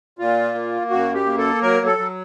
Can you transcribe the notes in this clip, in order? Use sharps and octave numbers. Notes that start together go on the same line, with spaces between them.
A#2 F4
A#3
F#2 F#4
G4
A#3
A4
F#3 A#4
A4
F#3